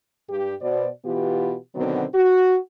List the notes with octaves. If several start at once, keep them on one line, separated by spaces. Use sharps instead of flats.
G2 G4
B2 C5 D5
B2 E3 B3 F4 G4
B2 D3 D#3 F#3 B3 C4
F#4